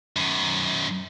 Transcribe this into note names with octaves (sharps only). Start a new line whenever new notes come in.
F#2 D#3